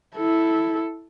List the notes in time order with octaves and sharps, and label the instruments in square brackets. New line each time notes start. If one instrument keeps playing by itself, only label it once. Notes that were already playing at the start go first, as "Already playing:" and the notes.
[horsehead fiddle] E4 A4